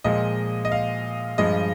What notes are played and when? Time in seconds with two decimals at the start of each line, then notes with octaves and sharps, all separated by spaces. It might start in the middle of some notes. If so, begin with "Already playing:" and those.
0.04 A#2 F3 G#3 D#5
0.65 D#5
0.72 F5
1.38 G2 F3 G#3 D#5